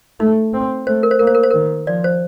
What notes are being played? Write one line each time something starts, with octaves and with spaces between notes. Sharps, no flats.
A3 D#4
C4
A3 C5
A#4
C5
A#3 A#4
C5
A#4
C5
D#3 A#4
F3 D5
C5